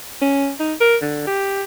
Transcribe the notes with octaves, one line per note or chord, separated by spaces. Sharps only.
C#4
D#4
A#4
D3
G4